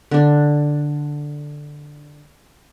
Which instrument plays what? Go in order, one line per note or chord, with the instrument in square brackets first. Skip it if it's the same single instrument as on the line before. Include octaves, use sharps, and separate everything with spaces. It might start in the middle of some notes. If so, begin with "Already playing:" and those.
[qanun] D3 D4